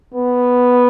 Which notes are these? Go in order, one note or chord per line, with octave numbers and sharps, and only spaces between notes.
B3